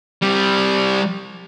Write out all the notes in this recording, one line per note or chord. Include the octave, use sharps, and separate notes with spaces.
G3 C4